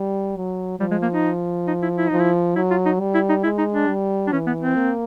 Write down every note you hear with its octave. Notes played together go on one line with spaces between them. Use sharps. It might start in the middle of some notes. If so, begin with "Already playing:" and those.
Already playing: G3
F#3
F3 G3
G#3
A#3
D#4
D#4
E4
E4
F3 D#4
E4
F#3 E4
F4
D#4
G3
E4
D#4
G#3 E4
D#4
D4
G3
D4
E3 C#4
B3
C4
A#3